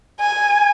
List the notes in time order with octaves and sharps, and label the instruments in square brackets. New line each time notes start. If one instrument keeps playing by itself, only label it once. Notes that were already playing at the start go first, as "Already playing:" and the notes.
[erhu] G#5